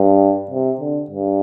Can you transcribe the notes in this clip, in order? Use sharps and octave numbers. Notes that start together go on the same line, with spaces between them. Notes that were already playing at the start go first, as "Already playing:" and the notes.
Already playing: G2
C3
D3
G2